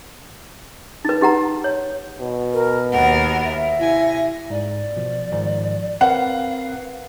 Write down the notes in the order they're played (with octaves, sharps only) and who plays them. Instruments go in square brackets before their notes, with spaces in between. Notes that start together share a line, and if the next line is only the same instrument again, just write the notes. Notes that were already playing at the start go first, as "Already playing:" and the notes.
[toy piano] D#4 B4
D#4 G4 F#5 A#5
C#5
[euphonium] B2
[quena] A#4
[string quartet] D#2 B3 A#4 [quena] F#5
[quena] E5
[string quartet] C3 G#5 A#6 [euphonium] E4
[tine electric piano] G#2 [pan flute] D5
[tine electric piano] B2 F3
G#2 D#3 F3
[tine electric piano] C4 A#4 B4 [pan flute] F5 [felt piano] F#5